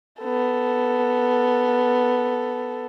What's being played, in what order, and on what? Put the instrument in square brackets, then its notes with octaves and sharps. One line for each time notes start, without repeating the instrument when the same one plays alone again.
[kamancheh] B3 A4